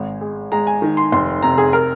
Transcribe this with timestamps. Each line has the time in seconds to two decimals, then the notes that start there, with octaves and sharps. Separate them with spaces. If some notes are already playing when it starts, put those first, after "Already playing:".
Already playing: G#1 G#3
0.21 G#3
0.52 G#3 A#5
0.67 G#5
0.82 D#3
0.97 C6
1.12 F1 C6
1.43 C3 A#5
1.58 G#4
1.73 A#4